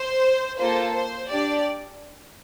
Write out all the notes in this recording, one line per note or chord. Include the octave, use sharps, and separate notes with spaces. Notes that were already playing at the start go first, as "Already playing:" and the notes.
Already playing: C5
A#3 F4 A4 C5
C5
D4 G4 D5